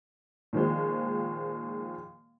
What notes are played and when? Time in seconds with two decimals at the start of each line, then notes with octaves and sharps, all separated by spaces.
0.53 A#2 D#3 F3 G#3